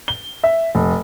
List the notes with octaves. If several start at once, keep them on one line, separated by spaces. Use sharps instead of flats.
G7
E5
F1